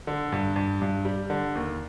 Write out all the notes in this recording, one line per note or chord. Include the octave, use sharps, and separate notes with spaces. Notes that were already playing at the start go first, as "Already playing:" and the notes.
D3
G2
G2
G2
G3
D3
D#2